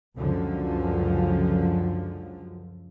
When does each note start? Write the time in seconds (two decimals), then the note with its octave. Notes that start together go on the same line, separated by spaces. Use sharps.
0.17 C#2 F#2 D3 F3